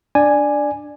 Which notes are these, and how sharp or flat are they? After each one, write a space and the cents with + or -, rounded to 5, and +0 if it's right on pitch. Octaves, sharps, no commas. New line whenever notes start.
D4 +0 D5 +10 G#5 +0